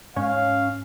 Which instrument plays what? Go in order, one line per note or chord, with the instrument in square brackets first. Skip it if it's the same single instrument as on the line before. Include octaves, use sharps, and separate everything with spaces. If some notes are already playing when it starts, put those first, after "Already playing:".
[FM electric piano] G#2 [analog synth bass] C#4 [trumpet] F5